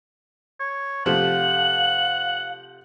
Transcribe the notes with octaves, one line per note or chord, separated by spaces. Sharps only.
C#5
C3 F3 A3 F5 F#5 F#7